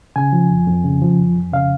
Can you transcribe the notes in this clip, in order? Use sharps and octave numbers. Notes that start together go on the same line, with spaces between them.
C#3 G#5
F3
F2
F2
C#3
F3
F2
F2
C#3 F5